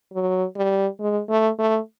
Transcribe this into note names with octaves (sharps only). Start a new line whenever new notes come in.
F#3
G3
G#3
A3
A3